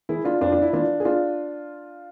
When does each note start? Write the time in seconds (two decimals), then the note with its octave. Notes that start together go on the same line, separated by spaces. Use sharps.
0.09 E3 E4 G#4
0.25 D4 F4
0.41 F2 D4 F4
0.52 D4
0.62 E4
0.73 E3 D4 F4
1.00 G#4
1.05 D4 F4